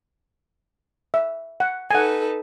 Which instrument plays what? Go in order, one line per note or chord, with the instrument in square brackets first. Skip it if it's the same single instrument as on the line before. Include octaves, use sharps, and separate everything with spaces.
[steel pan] E5
F#5
[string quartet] D#4 A4 B4 [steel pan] F#5 G#5